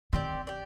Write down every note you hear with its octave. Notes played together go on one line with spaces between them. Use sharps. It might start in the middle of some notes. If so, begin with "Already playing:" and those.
D#3 C4 G4 D5
G4 D5